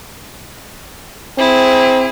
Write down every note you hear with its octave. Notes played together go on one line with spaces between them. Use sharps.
C4 E4 G#4